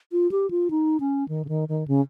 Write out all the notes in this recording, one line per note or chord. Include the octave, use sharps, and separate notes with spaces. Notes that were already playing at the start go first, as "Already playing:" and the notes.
F4
G4
F4
D#4
C#4
D#3
C#3
D#3
D#3
C#3